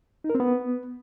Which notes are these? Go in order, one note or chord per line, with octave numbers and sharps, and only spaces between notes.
D#4
A#4
C4
B3